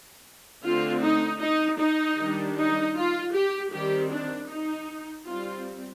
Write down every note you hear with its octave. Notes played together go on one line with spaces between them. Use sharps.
D3 A3 C4 F4
D#4
D#4
D#4
D#3 G3 D4
D#4
F4
G4
D#3 G3 C4 G4
D4
D#4
G3 C4 F4